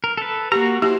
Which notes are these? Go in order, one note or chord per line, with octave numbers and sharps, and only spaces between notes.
A#4
A4 B4
A#3 F#4 G4 A#5
E4 F#4 G4 C5